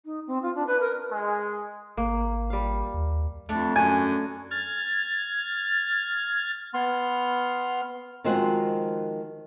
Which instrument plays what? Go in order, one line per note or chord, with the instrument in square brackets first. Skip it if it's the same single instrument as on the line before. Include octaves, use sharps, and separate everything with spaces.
[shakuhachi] D#4
C4
F4
D4
B4
A#4
[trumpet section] G#3
[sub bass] G#1 [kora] A#3
[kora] G3 F5
[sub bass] D#2
[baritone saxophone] F2 [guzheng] A3 D4
[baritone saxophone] F#2 [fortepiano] G#5
[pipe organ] F6 G#6 A6
[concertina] B3 C6 F6
[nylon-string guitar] D#3 F3 G#3 C4 F4 F#4